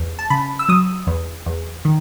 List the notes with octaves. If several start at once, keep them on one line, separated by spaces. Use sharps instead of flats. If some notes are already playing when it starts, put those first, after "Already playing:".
Already playing: E2
A5
C#3 B5
E6
F#3 D#6
E2
E2
D#3